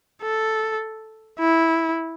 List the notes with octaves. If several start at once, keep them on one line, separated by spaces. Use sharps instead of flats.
A4
E4